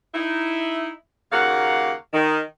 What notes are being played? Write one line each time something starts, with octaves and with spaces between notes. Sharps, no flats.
D#4 E4
D#2 C#3 A#3 F#4 F5 F#5
D#3